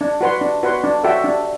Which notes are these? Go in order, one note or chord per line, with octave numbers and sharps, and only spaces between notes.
D4
F#4 B4 F#5 C6
D4
F#4 B4 F#5 C6
D4
F#4 A4 E5 G5
D4